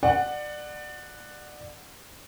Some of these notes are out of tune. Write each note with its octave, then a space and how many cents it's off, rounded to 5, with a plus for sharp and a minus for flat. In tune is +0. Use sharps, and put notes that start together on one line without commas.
D5 +25 F#5 +0